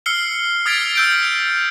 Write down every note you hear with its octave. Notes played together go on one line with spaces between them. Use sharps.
E6 F6 C7 C#7 G7
D#6 F6 G#6 A6 B6 D7
E6 G6 D7